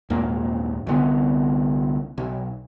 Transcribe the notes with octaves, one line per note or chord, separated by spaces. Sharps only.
A#1 D#2 G#2 A#3
C2 D3 B3
B1